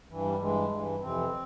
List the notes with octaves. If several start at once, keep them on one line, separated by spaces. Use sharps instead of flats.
G2 E3
G3
G2 E3 G#3
G2 E3
F2 C3 E3 C4